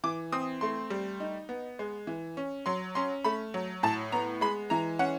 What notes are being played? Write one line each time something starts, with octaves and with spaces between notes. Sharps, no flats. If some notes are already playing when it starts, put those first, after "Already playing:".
E3 D6
C4 D#6
A3 C6
G3
D#4
B3
G#3
E3
C#4
F#3 C6
C#4 C6
A3 B5
F#3
A2 A5
B3 A#5
G#3 B5
E3 A#5
C#4 F#5